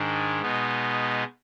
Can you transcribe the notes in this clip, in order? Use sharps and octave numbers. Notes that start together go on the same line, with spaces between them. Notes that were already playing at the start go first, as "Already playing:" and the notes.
Already playing: G#2 D#3 G#3 D4
B2 G#3 B3 D#4